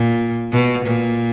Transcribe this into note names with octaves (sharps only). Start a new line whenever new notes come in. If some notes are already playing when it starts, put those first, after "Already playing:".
Already playing: A#2
B2
A#2